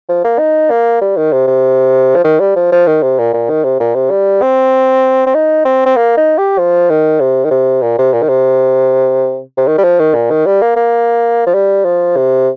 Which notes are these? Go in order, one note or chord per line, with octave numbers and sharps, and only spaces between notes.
F3
A#3
D#4
A#3
G3
D#3
C3
C3
F3
D#3
G3
F3
F3
D#3
C3
A#2
A#2
D#3
C3
A#2
C3
G3
C4
C4
D#4
C4
C4
A#3
D#4
G4
F3
D#3
C3
D#3
C3
A#2
C3
A#2
D#3
C3
C3
D#3
G3
F3
D#3
A#2
D#3
G3
A#3
A#3
F3
G3
F3
C3